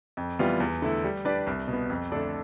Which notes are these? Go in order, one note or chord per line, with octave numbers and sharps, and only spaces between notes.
F2
E3 G3 B3 F4
E2
D3 A3 E4
G3
D4 G4 B4 D5
C2
B2
B3
F2
D3 A3 D4 A4